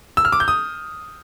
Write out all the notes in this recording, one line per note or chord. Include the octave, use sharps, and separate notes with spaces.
E6
F6
D6
G6
D#6